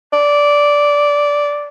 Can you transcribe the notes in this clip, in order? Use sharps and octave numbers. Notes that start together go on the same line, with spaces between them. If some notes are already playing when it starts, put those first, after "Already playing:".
D5